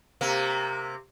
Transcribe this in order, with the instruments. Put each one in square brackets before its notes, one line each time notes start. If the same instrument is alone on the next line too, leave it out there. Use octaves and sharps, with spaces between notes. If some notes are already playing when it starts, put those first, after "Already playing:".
[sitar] C3 A#3